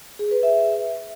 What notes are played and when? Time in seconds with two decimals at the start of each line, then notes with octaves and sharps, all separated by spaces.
0.19 G#4
0.31 B4
0.43 E5